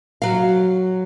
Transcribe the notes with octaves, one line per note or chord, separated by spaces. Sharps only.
F#3 F5